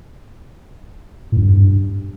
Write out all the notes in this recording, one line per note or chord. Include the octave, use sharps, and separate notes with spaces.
A2
F#2
G2